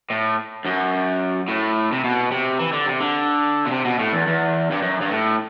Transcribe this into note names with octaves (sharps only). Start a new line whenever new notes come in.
A2
F#2
A2
C3
B2
C3
E3
D3
C3
D3
B2
C3
B2
A2
E2
E2
G2
F#2
G2
A2